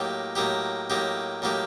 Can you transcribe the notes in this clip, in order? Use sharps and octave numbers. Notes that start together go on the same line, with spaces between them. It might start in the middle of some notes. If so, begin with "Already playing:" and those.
Already playing: A2 F#3 A#3 D#4 G4
A2 F#3 A#3 D#4 G4
A2 F#3 A#3 D#4 G4
A2 F#3 A#3 D#4 G4